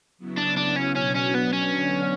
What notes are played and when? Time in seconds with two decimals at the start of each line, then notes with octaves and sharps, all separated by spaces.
0.18 C#3 F#3 B3 E4
0.37 D4
0.57 D4
0.76 C#4
0.95 B2 F#3 B3 C#4 D4
1.15 C#4
1.34 B3
1.53 C#4
1.72 D3 F#3 B3 D4